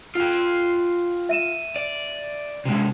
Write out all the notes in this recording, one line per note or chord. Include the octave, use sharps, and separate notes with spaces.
F4 G5
E5 D#7 E7
D5
C3 G#3